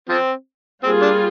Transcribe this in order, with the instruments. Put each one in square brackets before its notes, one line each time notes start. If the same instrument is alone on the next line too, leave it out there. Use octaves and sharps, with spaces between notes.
[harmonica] F3 C4
[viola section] G3 A#3 F4 G#4 [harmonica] C4
[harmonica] D4